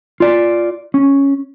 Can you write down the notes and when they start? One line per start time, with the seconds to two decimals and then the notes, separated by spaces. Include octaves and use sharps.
0.20 F4 D5
0.94 C#4